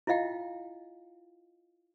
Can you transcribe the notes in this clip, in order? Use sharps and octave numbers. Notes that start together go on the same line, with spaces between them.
E4 F4 D#5 F5 G5